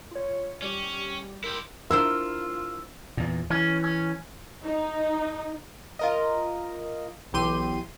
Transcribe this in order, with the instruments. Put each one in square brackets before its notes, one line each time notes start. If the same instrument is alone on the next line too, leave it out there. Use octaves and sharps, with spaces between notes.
[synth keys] F4 C#5
[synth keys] G3 G4 [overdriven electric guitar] C#4
[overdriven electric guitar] E4 G4 [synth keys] A#4 C6
[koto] D4 E4 C5 [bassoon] F4 [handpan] A#4 [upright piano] E6
[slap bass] E2 A#2
[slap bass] E3 [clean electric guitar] C#4
[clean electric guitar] C#4
[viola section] D#4
[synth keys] F4 A#4 D#5
B1 E3 G4 C6 D#7